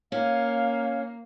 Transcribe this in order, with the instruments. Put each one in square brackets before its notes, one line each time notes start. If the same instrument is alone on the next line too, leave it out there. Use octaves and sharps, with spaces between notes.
[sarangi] A#3 [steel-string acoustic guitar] C#4 [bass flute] F5